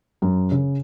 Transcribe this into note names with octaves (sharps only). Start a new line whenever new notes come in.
F#2
C#3